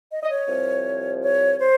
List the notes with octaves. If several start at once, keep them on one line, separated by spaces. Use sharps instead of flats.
D#5
D#5
C#5
C2 C3 F3
C#5
C5